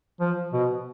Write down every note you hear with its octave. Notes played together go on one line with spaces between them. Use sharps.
F3
B2